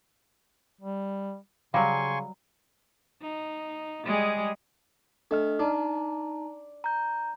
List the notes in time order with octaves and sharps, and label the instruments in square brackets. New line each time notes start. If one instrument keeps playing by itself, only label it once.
[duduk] G3
[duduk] C#3 [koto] F#3 G3 [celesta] F5 [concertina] G#5 C6 C#6
[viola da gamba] D#4
G3 G#3 G#4
[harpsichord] A3 [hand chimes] D4 D#5 F6
[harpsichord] D4 [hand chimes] D#4 A5 A#5
[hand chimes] A#5 G6